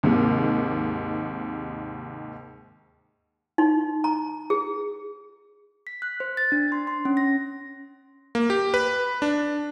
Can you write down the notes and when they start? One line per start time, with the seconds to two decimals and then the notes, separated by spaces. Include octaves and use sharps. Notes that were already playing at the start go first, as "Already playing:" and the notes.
0.03 D#2 G#2 C3
3.58 D#4
4.04 A#5
4.50 G#4
5.87 B6
6.02 F#6
6.20 C5
6.37 A6
6.52 D4
6.72 C6
6.87 C6
7.05 C#4
7.17 A#6
8.35 A#3
8.50 G4
8.74 B4
9.22 D4